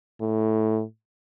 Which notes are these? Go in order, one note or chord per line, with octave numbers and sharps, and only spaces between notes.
A2